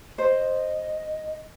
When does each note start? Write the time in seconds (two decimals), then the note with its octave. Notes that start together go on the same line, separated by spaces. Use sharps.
0.18 C5 D#5